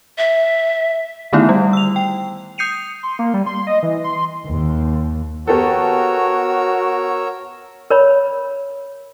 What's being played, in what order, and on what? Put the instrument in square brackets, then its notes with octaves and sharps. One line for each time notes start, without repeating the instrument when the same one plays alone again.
[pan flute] E5
[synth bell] D3 D#3 A3 B3 D#4 E4
G3
E6 F7
G5
D#6 G6 C7 C#7 D#7 F7
[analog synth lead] C6
A#3
G3
C6
D#5
E3
C6
[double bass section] D#2
[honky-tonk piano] B3 G4 A4 [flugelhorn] F#4 [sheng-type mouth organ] A#4 C#5 E6
[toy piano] A#4 C#5 B5